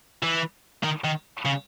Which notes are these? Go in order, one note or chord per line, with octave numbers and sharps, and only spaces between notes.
E3
D#3
D#3
C#3